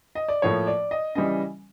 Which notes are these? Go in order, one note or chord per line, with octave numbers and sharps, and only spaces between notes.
D#5
D5
A2 F3 A#3 C#5
D5
D#5
C#3 E3 G3 D#5